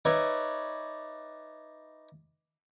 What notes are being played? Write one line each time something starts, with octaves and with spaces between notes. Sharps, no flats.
D#4 B4 C#5 D5 E5